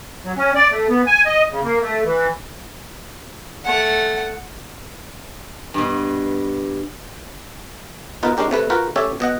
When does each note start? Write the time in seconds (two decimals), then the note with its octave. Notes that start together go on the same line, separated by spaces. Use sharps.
0.24 F#3
0.37 C#4
0.55 D5
0.71 A3
0.89 B3
1.06 G#5
1.26 D#5
1.51 C#3
1.63 A#3
1.81 A3
2.05 E3
3.65 A3 F#5
5.74 G2 B2
8.23 B2 D#4 F4 A#4 B4
8.37 G#3 C#4 D4 G4 A#4
8.51 C3 A3 B4
8.70 F4 F#4 A#4 B4 F#5 G5
8.96 A3 C#4 G4 A4 C#5 E5
9.20 B2 D#5 F#5